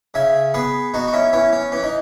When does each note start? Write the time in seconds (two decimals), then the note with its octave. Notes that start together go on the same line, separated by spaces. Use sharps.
0.14 C#3 E5 G#5
0.54 B3 G#4 B4
0.94 B3 D#4 F#4
1.08 F#4
1.13 C#4 E4
1.33 B3 C#4 E4
1.53 C#4
1.72 E3 C#4
1.83 D#4